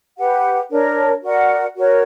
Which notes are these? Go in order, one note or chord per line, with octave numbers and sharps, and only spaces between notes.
G4 B4 F#5
D4 A#4 C#5
F#4 A#4 D5 F#5
F#4 A#4 C#5